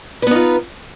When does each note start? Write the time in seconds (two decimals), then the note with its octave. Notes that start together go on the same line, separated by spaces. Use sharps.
0.22 B4
0.27 B3
0.31 D#4
0.36 F4